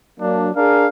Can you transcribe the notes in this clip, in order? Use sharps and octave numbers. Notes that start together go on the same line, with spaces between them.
F#3 A#3 D4
D4 G#4 A#4 F5